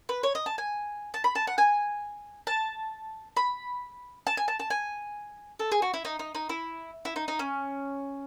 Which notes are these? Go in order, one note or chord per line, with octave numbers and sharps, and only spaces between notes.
B4
C#5
D#5
A5
G#5
A5
B5
A5
F#5
G#5
A5
B5
A5
G#5
A5
A5
G#5
A4
G#4
F#4
E4
D#4
D#4
D#4
E4
E4
D#4
D#4
C#4